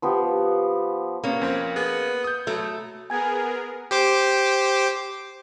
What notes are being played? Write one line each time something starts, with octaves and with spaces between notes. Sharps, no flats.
F3 B3 G4
A#3 B3 C#4
F2 C4
B3 G#4
D#6 G6
F#3 A3
B3 G#4 A#4 G#5 G#6
G4 C5 D6